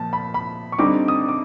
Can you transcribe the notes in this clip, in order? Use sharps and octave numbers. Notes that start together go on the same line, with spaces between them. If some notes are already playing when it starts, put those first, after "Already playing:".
Already playing: A#2 F3 A5
B5
B5
C#6
D3 G3 C4 D#4 D6
D#6
D6